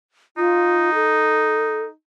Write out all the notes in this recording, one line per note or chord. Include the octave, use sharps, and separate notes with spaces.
D#4 F4
A4